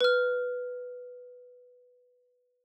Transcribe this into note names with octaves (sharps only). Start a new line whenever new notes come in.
B4 F6